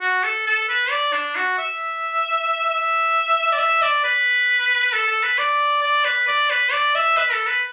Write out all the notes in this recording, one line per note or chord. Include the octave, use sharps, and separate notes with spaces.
F#4
A4
A4
B4
D5
D4
F#4
E5
E5
D5
E5
D5
B4
A4
A4
B4
D5
D5
B4
D5
B4
D5
E5
B4
A4
B4